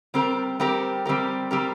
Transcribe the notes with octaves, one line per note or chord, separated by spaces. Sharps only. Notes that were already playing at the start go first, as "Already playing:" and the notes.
G3 C4 G4 A#4
G3 C4 G4 A#4
G3 C4 G4 A#4
G3 C4 G4 A#4